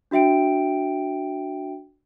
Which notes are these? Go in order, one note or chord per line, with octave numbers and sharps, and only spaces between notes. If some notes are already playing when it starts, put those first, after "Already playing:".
D4 F#4 E5 G5 D7